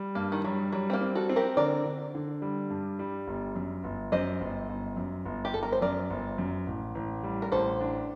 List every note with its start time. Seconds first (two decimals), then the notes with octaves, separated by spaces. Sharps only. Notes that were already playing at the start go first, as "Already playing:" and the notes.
Already playing: G3
0.15 G2 A#3
0.32 D#3
0.44 F#3 G3
0.72 F#3 G3
0.90 C4
0.93 A#3
1.01 C4
1.15 F#4 A4
1.29 C4
1.36 G4 A#4
1.57 D3 A#4 D5
1.85 D3
2.15 D3
2.42 G3
2.70 G2
2.99 G3
3.28 G1
3.56 F#2
3.84 G1
4.12 F#2 C5 D#5
4.40 G1
4.69 G1
4.97 F#2
5.25 G1
5.45 G4
5.54 G1 A4
5.63 A#4
5.72 C5
5.82 F#2 A#4 D5
6.10 G1
6.38 F#2
6.66 A1
6.95 A1
7.23 G3
7.42 A#4
7.52 A1 A4 C5
7.80 D4